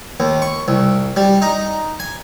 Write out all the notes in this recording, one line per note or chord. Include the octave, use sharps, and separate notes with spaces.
D#2
C#6
C2
G3
D#4
G#5